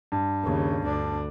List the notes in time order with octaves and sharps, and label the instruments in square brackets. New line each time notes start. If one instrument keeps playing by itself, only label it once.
[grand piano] G2
[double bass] D#2 C#3
D2 D4